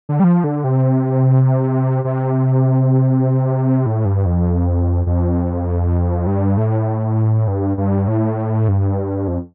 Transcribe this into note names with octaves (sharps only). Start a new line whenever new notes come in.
D3
G3
F3
D3
C3
C3
A2
G2
F2
F2
G2
A2
G2
G2
A2
G2
F2